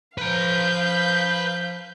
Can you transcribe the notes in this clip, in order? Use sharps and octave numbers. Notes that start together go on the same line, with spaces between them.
F3 B4 F5 A#5 G6